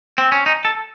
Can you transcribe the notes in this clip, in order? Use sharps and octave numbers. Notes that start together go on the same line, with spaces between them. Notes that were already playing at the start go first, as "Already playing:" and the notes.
C4
C#4
D#4
A4